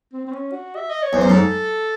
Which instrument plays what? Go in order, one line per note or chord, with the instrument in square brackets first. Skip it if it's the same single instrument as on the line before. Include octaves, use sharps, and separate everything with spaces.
[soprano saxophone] C4
C4
C#4
F#4
E5
D#5
C#5
[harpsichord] E2
[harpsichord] F#2 [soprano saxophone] C5
[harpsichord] G#2 [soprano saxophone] A4